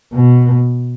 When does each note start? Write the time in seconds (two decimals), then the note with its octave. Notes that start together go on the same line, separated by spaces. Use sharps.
0.13 B2